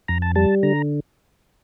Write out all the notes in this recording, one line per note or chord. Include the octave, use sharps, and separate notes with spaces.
F2 A#5
A5
G3 A5
D3 A#5